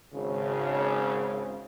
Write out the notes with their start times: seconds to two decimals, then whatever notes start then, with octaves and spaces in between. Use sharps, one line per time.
0.14 G#1 C#3